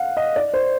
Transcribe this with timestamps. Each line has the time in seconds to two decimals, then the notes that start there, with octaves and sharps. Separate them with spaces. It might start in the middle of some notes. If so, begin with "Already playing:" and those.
Already playing: F5 F#5
0.17 D#5
0.36 D5
0.54 C5